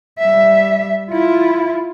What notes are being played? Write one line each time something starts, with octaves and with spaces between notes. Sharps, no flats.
G3 E5
E4 F4